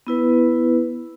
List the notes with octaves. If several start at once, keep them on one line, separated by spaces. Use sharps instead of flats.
B3 E4 B4